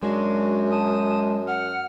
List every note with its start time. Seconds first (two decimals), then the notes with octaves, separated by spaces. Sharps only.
0.03 F#2 G#3 D4 F#4
0.71 A5 D#6
1.48 F#5 F6